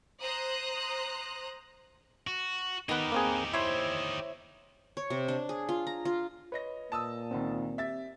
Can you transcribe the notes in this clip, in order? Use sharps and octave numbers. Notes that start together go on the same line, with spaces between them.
C5 A#5 D#6 F#6
F#4
D#3 B3 D#4 G4 A#4 B4
A#3 C4 G#4
E4 C5 C#5 E5
C#5
C3
D4
G#4
F4
A#5
F4
B4 C#5 D#5 A#6
A#2 A5 D#6 E6
C#2 D#3 C4 F#5
G4 E5 A6